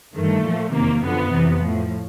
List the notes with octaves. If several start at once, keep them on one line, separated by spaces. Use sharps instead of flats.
G2 D#3 A3
A#2 F3
E2 C3 D#3 A#3
F#2 D3 F3 B3
F2 C3 E3
F3
A2